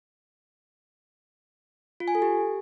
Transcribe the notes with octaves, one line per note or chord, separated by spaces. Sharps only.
F4
G#5
A4
G4